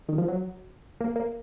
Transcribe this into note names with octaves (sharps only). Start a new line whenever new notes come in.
D#3
F3
F#3
A#3
A#3